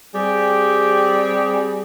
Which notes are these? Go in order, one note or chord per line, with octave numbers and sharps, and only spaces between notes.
G3 C4 G4 G#4